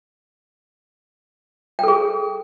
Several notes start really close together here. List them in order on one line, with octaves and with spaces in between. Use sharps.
G5 A4 G#4